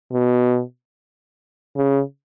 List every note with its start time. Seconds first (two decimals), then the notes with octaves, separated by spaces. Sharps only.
0.12 B2
1.77 C#3